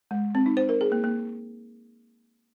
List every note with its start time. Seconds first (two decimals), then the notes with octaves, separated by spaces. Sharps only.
0.11 G#3
0.35 C4
0.46 D#4
0.57 C5
0.69 A#4
0.81 G#4
0.92 A#3
1.04 A#3